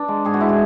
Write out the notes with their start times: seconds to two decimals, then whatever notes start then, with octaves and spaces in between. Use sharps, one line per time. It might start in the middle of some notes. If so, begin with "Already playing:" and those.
Already playing: D4
0.08 G#3
0.25 G#2 G#4
0.34 F#4
0.40 G#3 E4
0.49 F#4